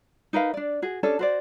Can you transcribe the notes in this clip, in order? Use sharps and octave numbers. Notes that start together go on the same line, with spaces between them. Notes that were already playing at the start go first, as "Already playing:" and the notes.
D#4 A#4 B4 F5
D4 D5
F#4 G#4
C#4 D4 G4 A4
F#4 C5 D5